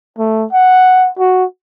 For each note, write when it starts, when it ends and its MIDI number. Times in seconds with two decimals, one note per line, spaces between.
0.18 0.45 57
0.52 1.09 78
1.19 1.45 66